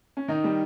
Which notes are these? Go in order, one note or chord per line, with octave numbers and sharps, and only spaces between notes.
C#4
D#3 D#4
G3